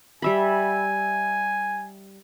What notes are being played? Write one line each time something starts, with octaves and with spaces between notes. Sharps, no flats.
G3 E5 G#5 B5